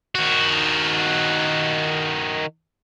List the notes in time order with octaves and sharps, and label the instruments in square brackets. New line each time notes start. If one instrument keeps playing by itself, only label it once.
[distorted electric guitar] D#3 F#4